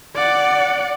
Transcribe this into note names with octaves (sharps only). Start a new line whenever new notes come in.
D5 F#5